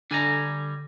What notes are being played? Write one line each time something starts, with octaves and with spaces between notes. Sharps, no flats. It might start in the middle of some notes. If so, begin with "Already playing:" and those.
D3 G3 G#5 A#5